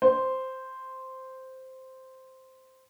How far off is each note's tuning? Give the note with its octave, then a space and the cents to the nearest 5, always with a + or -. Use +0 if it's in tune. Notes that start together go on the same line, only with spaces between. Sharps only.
C5 -5